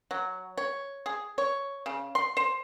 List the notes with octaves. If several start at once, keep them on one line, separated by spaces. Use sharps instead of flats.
F#3
C#5
G#4
C#5
C#3
C6
C5